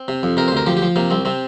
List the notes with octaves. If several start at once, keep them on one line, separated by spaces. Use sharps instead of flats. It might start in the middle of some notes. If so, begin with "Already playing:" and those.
Already playing: C4
C3
F2
C3 A#4
C5
D2 A#4
F3 G4
G4
F3
C3 A#3
C2 C4
C3 C4